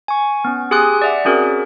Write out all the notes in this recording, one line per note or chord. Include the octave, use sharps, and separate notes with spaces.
G#5 C#6
B3 C#4
G4 G#4 G#5 C6 D#6 F#6
D5 E5 F#5
C4 C#4 F#4 G#4 A#4